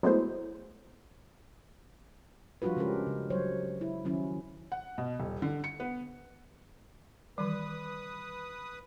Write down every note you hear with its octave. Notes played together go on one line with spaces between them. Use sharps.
F#3 G#3 A3 B3 E4 C5
F3 G3 D4 F4 F#4 B4
C#3 G#3 C#4 G4 A#4
C#3
F#3 G3 C5 C#5
E4
D#3 F#3 C#4 E4
F#5
B2
D#1
D3
C#7
B3
D#3 E3 G3 B4 D#6